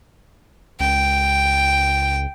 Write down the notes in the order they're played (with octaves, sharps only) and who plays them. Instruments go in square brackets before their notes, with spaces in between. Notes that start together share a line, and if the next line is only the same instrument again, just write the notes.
[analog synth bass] C#2 [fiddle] G5